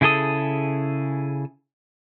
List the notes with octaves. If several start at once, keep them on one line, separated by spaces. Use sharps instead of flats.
C#3 E4 G#4 A4 D#6